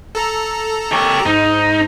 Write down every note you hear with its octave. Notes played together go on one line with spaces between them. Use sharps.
A4 A#5
G4 C#5
G#2 D#4